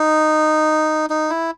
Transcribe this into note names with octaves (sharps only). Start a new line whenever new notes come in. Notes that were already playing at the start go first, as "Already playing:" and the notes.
Already playing: D#4
D#4
E4